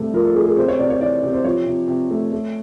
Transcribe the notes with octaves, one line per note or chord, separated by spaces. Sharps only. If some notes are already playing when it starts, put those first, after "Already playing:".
Already playing: G2 C3 A3
F3 A#4
A4
A3 G#4
G#4
C3 C5
C#5
C3 D5
C#5
E3 D5
C3
C5
F3 C#5
C3
C3
A3
A3